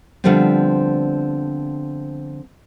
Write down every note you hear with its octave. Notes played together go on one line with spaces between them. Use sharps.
D3 F3 G3 A3 B3 C4